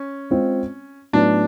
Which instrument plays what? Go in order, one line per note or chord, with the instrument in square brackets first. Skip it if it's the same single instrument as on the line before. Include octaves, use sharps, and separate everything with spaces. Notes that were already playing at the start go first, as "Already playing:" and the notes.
Already playing: [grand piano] C#4
[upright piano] G#3 C4 F4
[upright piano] A2 F#3 B3 D#4 [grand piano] D4